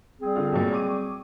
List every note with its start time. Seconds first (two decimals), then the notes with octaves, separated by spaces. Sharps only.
0.21 G3 C4 G#4
0.35 D3 F4
0.52 B1 F#2 A#2
0.73 C#6 D6 D#7